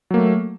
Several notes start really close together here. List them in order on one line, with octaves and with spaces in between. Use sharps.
F#3 A#3 A3